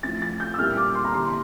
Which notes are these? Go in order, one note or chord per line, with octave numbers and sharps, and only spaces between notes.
A2 F3 A3 E4 A6
A6
G6
E6
A#2 G3 A#3 E4 F6
D6
C6
A#5
D3 G3 D4 C6